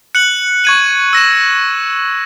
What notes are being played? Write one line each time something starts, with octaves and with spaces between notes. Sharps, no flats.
F#6 C#7 F#7
C#6 G#6 D#7 F#7
E6 A#6 E7